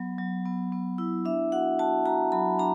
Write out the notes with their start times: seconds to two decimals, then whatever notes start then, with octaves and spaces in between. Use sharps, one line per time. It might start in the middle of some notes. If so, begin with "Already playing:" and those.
Already playing: F#3 B3
0.18 F#3
0.46 B3
0.72 B3
0.98 E4
1.25 D4 E5
1.52 F#4 F#5
1.79 F#4 A5
2.05 F#4 A#5
2.32 F#3 B5
2.59 D4 A#5